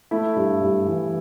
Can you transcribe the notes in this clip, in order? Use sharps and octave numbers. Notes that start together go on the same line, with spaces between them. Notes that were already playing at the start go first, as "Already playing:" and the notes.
A3 E4
G2
G2
E3